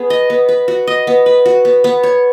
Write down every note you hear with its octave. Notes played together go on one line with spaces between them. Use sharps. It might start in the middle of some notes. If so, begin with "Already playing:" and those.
Already playing: B3 G#4
D#5
B3
B4
F#4
D#5
B3
B4
F#4
B3
B3
C#5